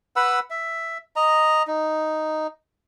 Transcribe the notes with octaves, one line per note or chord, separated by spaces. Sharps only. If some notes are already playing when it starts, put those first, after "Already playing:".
B4 F#5 B5 E6
E5
D#5 A#5
D#4